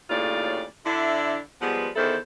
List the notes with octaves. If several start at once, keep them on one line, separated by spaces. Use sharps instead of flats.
D#2 A2 C#3 F4 D5
D3 D4 E4
F3 G3 G#3 B3
E2 D#3 E4 A4 C5